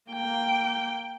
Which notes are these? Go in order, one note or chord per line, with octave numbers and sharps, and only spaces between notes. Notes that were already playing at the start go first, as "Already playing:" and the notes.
A#3 G5